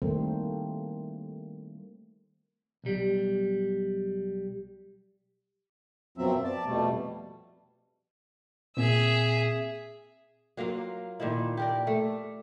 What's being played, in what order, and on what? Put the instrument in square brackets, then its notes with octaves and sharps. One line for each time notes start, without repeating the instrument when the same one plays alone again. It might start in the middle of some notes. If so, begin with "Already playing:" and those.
[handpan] D#3 G3 A3 A#3 C4 C5
[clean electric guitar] B1 G3
[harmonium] F#2 B2 F3 F#3 C4 E5
D5 A5
F2 B2 G3 A3
[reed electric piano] A#2 C4 [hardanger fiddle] G#4 E5
[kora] F#3 A#3 F4 F5
A#2 D#3 F3 E4
G4 A#4 D5
A3